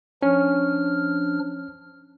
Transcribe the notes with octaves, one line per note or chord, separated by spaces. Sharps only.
F3 C#4 D4 F6